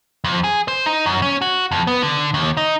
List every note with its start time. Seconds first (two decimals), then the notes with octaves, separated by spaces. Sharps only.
0.24 F2
0.44 G#4
0.68 C5
0.86 D#4
1.06 F#2
1.22 C#4
1.42 F#4
1.71 F2
1.87 B3
2.02 D3
2.34 D#2
2.57 D#4